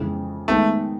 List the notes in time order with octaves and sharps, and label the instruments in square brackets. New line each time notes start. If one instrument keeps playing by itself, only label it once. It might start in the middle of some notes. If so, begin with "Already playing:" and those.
Already playing: [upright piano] F2 C#3 E3 G#3
[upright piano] D#3 G#3 B3 [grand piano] A3